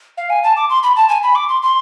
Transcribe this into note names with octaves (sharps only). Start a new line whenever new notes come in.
F5
G#5
A5
D6
C6
B5
A5
G#5
B5
D6
C6
C6